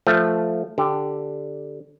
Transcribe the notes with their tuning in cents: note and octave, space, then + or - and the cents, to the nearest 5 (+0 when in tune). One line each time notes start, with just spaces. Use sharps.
F3 -5 A3 +0
D3 +0 G4 +0